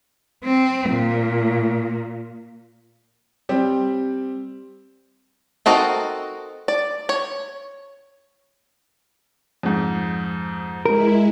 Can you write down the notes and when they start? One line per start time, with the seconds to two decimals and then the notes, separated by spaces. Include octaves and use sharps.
0.44 C4
0.91 A#2
3.49 G3 C4 G4
5.66 C4 D#4 F#4 A4 A#4
6.68 D5
7.09 C#5
9.63 F2 G#2
10.86 G#3 E4 A#4